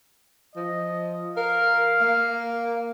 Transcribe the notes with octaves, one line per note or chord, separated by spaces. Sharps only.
F3 D#5
A#4 F5
A#3